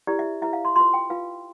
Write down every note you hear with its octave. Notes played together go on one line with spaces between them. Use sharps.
E4 G4 B4 D5
E5
E4 G4 B4 E5
F5
C6
F4 B4 C6
G5
F4 B4 F5